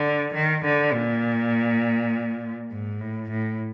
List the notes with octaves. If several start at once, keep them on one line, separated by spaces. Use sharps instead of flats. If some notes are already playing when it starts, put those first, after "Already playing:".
Already playing: D3
D#3
D3
A#2
G#2
A2
A2